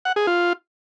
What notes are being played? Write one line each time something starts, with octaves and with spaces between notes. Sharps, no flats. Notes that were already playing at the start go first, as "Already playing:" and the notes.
F#5
G#4
F4